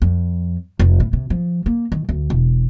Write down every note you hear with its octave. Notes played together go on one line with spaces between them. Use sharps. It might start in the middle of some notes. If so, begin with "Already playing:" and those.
F2
F1
A2
C3
F3
A#3
D#3
D2
E1